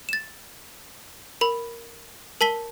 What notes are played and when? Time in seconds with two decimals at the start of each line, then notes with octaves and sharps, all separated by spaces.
0.09 A6 E7
1.41 A#4 B5
2.41 A#4 A5 B6 G7